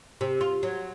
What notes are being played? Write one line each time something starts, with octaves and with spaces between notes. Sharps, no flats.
C3
F4
F#3